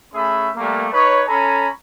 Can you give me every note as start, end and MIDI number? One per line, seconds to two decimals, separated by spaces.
0.13 0.49 57
0.13 0.49 61
0.13 0.49 68
0.13 0.49 76
0.13 0.49 83
0.56 0.87 55
0.56 0.87 57
0.56 0.87 58
0.93 1.23 63
0.93 1.23 71
0.93 1.23 73
1.27 1.68 61
1.27 1.68 69
1.27 1.68 80
1.27 1.68 82
1.27 1.68 83